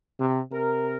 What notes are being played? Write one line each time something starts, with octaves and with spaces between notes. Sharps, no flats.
C3
C3 A#4